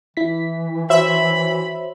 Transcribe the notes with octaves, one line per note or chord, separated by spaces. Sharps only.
E3 E4 B6
F#4 C5 C#5 E5 B5